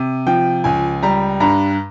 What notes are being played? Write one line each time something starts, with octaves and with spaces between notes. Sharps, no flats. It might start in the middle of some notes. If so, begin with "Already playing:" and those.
Already playing: C3
F3 G5
C#2 G#5
G3 A#5
G2 A#5